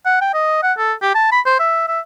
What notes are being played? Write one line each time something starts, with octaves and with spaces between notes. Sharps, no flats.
F#5
G5
D#5
F#5
A4
G4
A5
B5
C5
E5
E5